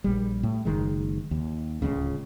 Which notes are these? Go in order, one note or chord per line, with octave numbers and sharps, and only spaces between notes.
A#1 G3
A2
F#1 D#3 G#3
D#2
D1 G1 C#2 C#3